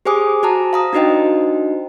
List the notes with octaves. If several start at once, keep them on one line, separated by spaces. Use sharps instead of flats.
G4 G#4 C5 G#5 D6 D#6
F#4 C5 A5 A#5
F5 A#5 D#6
D4 D#4 F#4 C5 D#5 G5